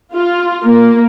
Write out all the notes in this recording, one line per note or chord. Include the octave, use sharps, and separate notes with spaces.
F4
A#3